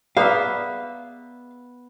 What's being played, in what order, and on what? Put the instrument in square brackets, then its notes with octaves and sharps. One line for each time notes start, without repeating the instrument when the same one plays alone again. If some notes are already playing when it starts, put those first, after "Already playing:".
[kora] B3 E5 [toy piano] G#4 D5 A#5 [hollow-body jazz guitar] F5